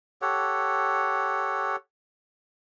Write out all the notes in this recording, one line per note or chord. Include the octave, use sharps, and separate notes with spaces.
G4 A4 C#5 F#5